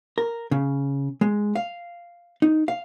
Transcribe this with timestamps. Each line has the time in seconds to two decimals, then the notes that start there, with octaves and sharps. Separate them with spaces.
0.18 A#4
0.51 C#3
1.21 G#3
1.56 F5
2.42 D#4
2.68 F5